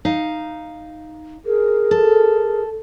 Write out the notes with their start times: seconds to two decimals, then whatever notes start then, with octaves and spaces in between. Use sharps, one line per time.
0.05 D#4 F5
1.46 G#4 A#4
1.91 A4